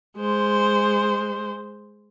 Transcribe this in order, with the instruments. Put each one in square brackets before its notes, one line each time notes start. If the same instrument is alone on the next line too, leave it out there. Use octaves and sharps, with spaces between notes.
[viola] G#3 C5